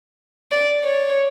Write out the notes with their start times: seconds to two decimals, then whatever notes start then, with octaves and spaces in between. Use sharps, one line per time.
0.51 D5
0.84 C#5